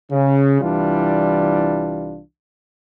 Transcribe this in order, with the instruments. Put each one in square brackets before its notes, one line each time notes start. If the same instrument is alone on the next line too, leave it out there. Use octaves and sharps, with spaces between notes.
[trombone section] C#3
C2 E3 G3 D4 F4